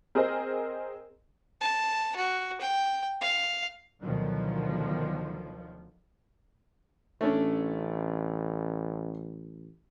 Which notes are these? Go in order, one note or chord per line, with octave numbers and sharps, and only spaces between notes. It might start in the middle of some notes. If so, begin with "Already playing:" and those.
C4 G#4 A#4 C5 D#5
A5
F#4
G5
F5
D2 B2 D#3 F3 F#3
A1 A3 C#4 D4